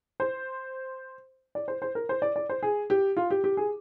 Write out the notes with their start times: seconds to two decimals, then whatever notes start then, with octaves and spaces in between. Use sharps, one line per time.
0.20 C5
1.55 D5
1.68 C5
1.82 C5
1.95 A#4
2.09 C5
2.22 D5
2.36 D5
2.49 C5
2.63 G#4
2.90 G4
3.17 F4
3.30 G4
3.44 G4
3.57 G#4